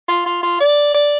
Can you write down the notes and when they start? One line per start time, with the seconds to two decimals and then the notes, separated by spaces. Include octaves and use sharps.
0.08 F4
0.26 F4
0.43 F4
0.60 D5
0.94 D5